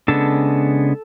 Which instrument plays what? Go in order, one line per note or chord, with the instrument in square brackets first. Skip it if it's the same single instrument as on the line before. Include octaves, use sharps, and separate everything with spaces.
[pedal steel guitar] C#3 G#3 B3 D4 A4 A5